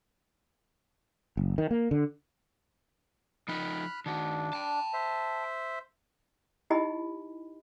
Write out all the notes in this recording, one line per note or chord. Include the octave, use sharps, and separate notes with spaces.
F#1
D#3
A#3
D3
F3 D#4 B5 F6 F#6
D#3 D4 F#4
G5 A5
C5 E5
D#4 E4 G4 D#5 G#5 B5